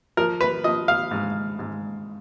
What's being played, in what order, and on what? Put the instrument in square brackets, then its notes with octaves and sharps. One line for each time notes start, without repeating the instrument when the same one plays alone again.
[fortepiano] F3 A#4
B4
F3 D#5
F5
G#2
G#2